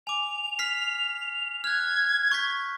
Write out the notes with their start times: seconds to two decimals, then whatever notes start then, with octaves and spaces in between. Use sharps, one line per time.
0.07 G#5 D6 F7
0.59 F6 B6 C7
1.64 F6 F#6 G#6
2.32 C#6 G6 B6